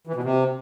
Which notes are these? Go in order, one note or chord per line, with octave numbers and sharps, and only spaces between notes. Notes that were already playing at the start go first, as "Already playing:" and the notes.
E3
B2
C3